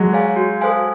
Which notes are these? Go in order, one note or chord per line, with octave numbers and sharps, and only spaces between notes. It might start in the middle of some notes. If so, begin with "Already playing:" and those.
Already playing: F#3 G#3
G#4 C#5 F5 G#5
F#4
A4 C5 F5 G#5